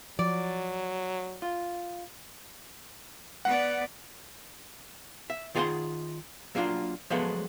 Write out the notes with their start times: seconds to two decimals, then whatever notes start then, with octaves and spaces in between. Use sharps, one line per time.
0.19 F3 F#3 D5
1.42 F4
3.45 B3 D5 F#5
5.30 E5
5.55 D#3 F4 G#4 D5 F#5 C6
6.55 F#3 A#3 D4 F4
7.10 F3 F#3 G#3 A3 B3